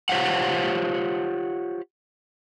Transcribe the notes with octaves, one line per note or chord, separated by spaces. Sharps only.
F4 G4 C5 C#5 F5 F#5